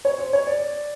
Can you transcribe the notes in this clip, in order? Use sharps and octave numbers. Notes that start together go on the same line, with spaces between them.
C#5
C5
C#5
D5